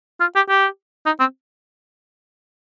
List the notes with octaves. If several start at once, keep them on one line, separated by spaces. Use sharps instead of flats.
F4
G4
G4
D#4
C4